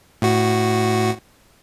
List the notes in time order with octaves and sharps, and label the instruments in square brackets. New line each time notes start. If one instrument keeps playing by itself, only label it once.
[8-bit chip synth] A2 F#4